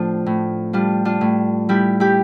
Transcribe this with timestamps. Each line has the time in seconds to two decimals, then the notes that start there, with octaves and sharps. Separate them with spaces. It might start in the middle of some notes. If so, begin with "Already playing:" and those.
Already playing: A2 F3 C4 D4 F4
0.26 A2
0.73 G3 D4 F4
1.05 D4 F4
1.21 A2
1.69 G3 E4 G4
2.00 E4 G4